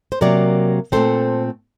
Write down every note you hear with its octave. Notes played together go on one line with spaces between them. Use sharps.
C5
C3 F#3 A#3 A#4 D5
A#2 A3 C4 A4 C5